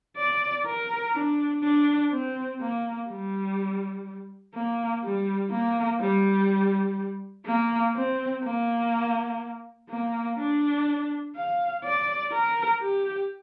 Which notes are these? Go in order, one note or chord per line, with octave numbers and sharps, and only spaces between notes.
D5
A#4
D4
D4
C4
A#3
G3
A#3
G3
A#3
G3
A#3
C4
A#3
A#3
D4
F5
D5
A#4
G4